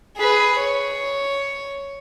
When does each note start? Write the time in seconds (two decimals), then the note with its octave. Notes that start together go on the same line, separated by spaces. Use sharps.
0.17 G#4 B4
0.58 C#5